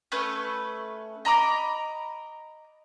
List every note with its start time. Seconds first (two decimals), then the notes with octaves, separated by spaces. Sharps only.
0.12 A3 C#4 B4
1.25 D#5 A#5 B5 D6